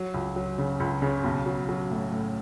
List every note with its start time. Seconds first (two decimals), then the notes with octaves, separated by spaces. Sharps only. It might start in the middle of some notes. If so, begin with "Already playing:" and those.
Already playing: F#3
0.14 C#2
0.36 F#3
0.58 C#3
0.80 C#2
1.02 C#3
1.24 B1
1.46 F#3
1.69 F#3
1.91 A2
2.13 A2